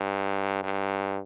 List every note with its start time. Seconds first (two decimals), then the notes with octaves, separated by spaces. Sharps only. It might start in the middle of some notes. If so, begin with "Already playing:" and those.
Already playing: G2
0.63 G2